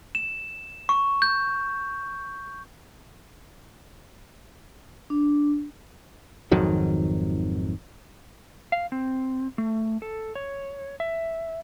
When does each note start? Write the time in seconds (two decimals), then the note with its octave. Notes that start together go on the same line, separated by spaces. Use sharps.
0.15 E7
0.89 C#6
1.22 G6
5.10 D4
6.51 G#1 F2 D#3 F#3
8.72 F5
8.92 C4
9.58 A3
10.02 A4
10.35 C#5
11.00 E5